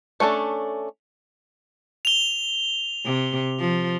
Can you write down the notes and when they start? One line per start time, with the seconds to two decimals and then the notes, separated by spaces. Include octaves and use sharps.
0.20 A3 C#4 D4 A4
2.05 F7 G7
3.05 C3
3.60 F3